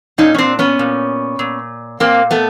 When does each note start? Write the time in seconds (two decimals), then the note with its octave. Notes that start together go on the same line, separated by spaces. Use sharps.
0.18 A#2 C#4 D#4
0.35 C#4
0.38 C4 D4
0.59 B3 C#4
0.79 A#2
1.39 A#2
2.00 A#2 A#3 C4
2.31 A3 B3